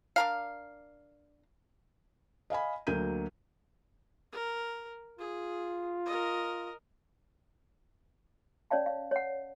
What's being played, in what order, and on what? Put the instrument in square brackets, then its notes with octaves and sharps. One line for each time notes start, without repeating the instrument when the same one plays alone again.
[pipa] D4 A#4 F5
[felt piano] D#5 F5 G#5 B5
D2 F#3 A#3 G6 D#7
[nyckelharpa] A#4
[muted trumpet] F4 [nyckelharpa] G#4
[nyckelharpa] A#4 D#5
[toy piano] C#4 C#5 D5 F5 A5
F5
C#5 F#5